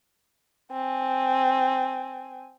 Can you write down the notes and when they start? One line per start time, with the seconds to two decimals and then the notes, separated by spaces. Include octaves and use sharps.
0.72 C4 G#5